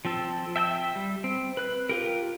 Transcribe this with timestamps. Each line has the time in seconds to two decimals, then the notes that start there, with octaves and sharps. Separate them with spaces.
0.05 F3 C4 A4
0.56 E5 G5 A5 E6
0.96 G3
1.24 C4
1.57 B4 F#6
1.89 F4 G4 A#4